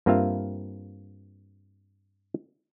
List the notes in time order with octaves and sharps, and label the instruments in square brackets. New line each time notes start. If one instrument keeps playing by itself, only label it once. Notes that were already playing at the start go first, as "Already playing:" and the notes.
[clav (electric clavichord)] G2 A#3 C4 F4 E5 F5